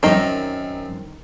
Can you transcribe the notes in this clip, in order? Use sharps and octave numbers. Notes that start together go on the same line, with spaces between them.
F#2 D#3 C4 D#4